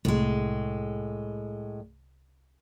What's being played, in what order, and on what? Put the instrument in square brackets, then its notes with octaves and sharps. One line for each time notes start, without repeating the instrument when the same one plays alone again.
[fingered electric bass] C2 [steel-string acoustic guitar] A2 G#3